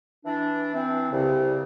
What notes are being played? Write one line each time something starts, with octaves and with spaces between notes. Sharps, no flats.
E3 D4
E3 C4
C2 C#3